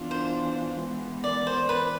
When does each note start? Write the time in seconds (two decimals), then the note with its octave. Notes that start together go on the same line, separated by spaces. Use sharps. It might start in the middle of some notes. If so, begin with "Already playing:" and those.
Already playing: E3 B3 D4 F4
0.11 C5
0.78 E3 G#3 B3
1.24 D5
1.47 C5
1.68 E3 B4